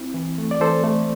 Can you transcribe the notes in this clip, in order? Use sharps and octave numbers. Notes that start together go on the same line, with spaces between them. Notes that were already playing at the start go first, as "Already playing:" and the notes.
Already playing: C4 E4
E3
A3
D5
E3 A4 C5
A3